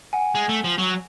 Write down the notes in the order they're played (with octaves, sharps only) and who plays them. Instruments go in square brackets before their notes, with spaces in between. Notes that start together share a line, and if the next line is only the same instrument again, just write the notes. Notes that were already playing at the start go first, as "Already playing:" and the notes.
[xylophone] F#5 G#5
[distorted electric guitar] G#3
A3
F3
F#3